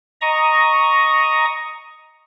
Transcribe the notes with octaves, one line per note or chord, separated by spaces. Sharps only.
D#5 A#5 C#6 D#6